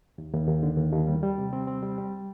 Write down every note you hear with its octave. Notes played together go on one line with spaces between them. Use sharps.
D#2
D#2
D#2
D3
D#2
D#2
G3
G3
C3
C4
C4
G3
G3